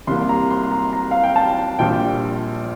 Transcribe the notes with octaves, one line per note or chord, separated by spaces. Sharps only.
C2 C3 G3 A#3 C6
A#5
C6
A#5
A#5
F5
G5
A5
A#1 A#2 G3 G5